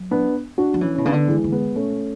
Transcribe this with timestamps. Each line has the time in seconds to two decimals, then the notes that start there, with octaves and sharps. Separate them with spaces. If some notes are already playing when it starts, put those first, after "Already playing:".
Already playing: F#3
0.11 B3 D4
0.58 D4 F#4
0.74 F#3
0.81 E3 C#4 E4
0.95 B2 C#4
1.05 C#3 B3 D4
1.12 D3
1.28 E3 G#3
1.44 D3
1.52 G#3 B3
1.75 B2 A3 C#4